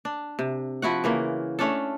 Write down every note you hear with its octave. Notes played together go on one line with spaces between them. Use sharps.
D4
C3
F3 E4 F#4 F#5
C#3 E3 A#3
A3 C#4 D4 A4